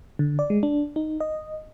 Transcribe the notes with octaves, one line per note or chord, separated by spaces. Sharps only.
D3
D5
G#3
D4
D#4
D#5